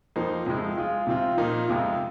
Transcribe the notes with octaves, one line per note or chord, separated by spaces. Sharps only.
F2 F3 A#3 D#4 C5
F2 C3 F3 G#3
G#3 F4 G#4
C3 F3 C4 F4
A#2 F3 A#3 D#4
F2 C3 G#3 F4